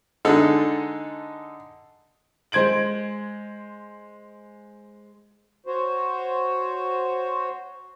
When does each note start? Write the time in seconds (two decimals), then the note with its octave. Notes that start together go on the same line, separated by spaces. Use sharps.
0.25 D3 G#3 D#4 A4
2.52 G#3 C5 G#6 D7 F#7
5.66 F#4 C5 C#5